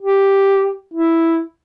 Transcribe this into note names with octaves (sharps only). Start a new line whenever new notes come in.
G4
E4